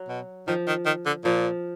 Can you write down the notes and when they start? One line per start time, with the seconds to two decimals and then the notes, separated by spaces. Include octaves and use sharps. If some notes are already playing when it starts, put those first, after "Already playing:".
Already playing: F#3
0.08 B2
0.47 D#3 F3
0.67 D#3
0.86 D#3
1.06 D3
1.24 A#2 F3